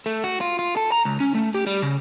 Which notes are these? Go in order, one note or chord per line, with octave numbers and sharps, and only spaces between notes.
A3
F#4
F4
F4
A4
A#5
C#2
C#4
A3
G4
G3
C#3